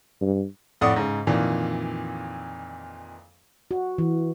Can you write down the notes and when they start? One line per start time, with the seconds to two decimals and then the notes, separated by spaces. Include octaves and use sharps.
0.21 G2
0.81 F2 A2 D5 F#5 D#6
0.96 G#2 C#3
1.27 F2 A#2 D#3 E3
3.71 F#4
3.98 E3